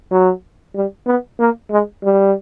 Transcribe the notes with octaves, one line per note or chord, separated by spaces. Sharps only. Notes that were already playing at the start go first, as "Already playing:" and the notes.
F#3
G3
B3
A#3
G#3
G3